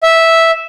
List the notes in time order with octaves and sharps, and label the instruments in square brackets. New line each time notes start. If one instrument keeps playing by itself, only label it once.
[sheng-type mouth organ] E5